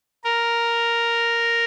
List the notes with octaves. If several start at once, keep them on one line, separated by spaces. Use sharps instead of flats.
A#4